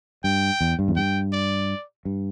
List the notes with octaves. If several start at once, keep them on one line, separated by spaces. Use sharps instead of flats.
G2 G5
E2
G2
E2
G2 G5
D5
G2